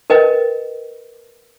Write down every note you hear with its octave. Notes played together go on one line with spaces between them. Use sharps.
A#4 B4 D#5 G5